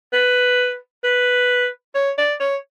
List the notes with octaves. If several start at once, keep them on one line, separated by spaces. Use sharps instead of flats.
B4
B4
C#5
D5
C#5